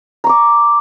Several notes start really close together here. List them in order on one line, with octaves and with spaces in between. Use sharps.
A#5 C#6 D6